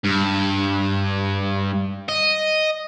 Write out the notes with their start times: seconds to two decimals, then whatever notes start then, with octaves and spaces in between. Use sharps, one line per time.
0.05 G2
2.08 D#5